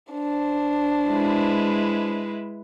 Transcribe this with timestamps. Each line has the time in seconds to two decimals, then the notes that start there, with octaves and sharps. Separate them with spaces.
0.12 D4 C5
1.09 G#3 E4 B4